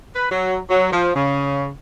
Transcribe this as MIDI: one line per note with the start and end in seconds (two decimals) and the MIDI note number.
0.15 0.27 71
0.30 0.58 54
0.70 0.92 54
0.92 1.14 53
1.15 1.70 49